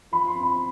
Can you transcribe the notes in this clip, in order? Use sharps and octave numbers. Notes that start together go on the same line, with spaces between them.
F3 B5
C6
C4
B5